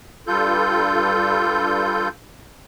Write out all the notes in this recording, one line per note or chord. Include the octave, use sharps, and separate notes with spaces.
G2 G3 F4 A4 G6